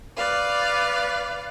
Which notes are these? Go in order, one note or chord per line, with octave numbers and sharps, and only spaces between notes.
B4 D5 F5